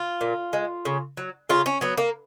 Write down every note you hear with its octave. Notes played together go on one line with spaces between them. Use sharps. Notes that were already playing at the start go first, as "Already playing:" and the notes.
Already playing: F4
A#2
G#3
C#3
F#3
C#3 F4
C#4
F#3 B3
A#3